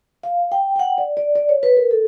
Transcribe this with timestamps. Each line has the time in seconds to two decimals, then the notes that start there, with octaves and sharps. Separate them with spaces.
0.23 F5
0.52 G5
0.76 G5
0.79 F#5
0.98 D5
1.17 D5
1.35 D5
1.49 C#5
1.63 B4
1.77 A#4
1.91 A4